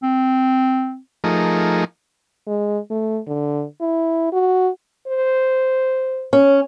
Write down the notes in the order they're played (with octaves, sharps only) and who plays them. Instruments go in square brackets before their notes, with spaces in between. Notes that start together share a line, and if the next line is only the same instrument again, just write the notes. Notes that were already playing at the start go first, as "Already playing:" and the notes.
[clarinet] C4
[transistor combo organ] F3 A3 D#4 G#4 A#4
[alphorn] G#3
A3
D3
E4
F#4
[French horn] C5
[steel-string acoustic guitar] C#4